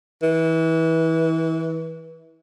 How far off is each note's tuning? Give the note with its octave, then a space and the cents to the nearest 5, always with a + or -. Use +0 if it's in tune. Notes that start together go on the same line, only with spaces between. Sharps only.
E3 -25